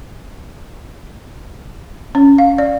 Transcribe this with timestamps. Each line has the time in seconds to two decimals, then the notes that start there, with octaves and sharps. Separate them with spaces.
2.15 C#4
2.38 F5
2.58 D5